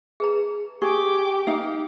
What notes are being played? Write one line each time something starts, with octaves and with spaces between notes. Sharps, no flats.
G#4 B4 A#5
G4 G#4 C#6 D6
D#4 G4 F5